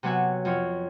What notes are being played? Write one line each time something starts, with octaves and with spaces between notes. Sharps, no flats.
C3 F#3 B3 E5 G#5 F#6
F2 F3 C#5